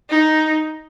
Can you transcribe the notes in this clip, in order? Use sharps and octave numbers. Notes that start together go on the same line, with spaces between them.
D#4